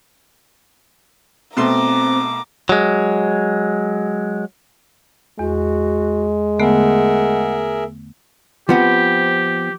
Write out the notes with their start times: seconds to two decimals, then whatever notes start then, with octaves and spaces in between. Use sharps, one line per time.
1.57 B2 A3 C4 A#5 C6 D6
2.69 F#3 G#3
5.39 E2 G#3 F#4
6.59 D3 A3 B3 G#4 A#4 E5 F#5
8.69 F3 B3 C4 G4